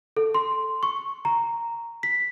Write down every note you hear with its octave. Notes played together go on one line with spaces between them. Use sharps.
A4
C6
C#6
A#5
B6